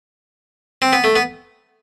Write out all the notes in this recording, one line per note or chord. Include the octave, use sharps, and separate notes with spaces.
C4
B3
A3
B3